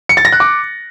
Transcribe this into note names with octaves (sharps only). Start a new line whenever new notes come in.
C#7
A6
A#6
F#6
D6